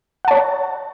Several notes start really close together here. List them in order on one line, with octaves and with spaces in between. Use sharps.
F#5 A5 C#5